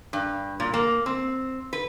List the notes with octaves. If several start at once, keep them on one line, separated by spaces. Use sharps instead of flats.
G2
A#2
A#3
C4
B4